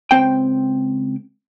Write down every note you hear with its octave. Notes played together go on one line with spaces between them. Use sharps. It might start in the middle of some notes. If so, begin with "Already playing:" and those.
C#2 C4 G5